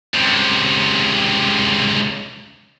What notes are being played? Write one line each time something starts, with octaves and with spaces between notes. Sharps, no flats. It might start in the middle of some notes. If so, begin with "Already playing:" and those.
C#2 C3